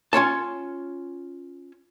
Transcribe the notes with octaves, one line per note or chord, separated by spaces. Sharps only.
C#4 F4 C#5 A5